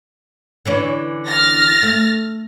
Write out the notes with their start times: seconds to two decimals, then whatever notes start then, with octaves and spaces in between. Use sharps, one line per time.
0.65 D3 E3 C#4
1.26 F6 A6 A#6
1.83 A3